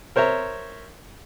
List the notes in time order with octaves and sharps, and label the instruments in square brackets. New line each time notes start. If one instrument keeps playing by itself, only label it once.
[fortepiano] A#4 C5 C#5 E5 A#5